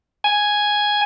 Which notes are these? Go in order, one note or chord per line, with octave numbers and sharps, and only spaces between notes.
G#5